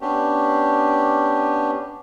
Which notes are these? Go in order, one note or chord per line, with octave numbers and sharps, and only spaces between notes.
B3 C#4 D4 G4